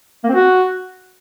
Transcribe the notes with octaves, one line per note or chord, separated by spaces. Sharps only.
A#3
C4
F#4